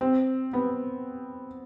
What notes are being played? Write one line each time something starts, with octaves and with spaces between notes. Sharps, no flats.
C4
B3